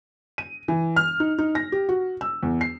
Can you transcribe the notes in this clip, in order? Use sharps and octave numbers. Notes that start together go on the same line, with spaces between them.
D#7
E3
F6
D#4
D#4
A#6
G4
F#4
E6
E2
C7